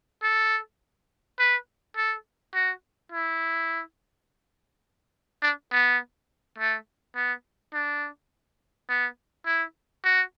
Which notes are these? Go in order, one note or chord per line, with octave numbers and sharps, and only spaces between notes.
A4
B4
A4
F#4
E4
D4
B3
A3
B3
D4
B3
E4
F#4